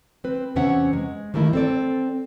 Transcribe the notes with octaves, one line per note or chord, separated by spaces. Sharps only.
C4 B4
E2 C3 B3 C#4 E5 F#5
G#3
D#3 E3 G3 A3 A#3 E4
C4 A4 D5